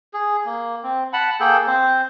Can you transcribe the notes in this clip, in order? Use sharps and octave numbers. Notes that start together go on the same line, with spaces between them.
G#4
A#3
C4
F#5 A5 B5
A#3 G#4 A4 G5
C4 C5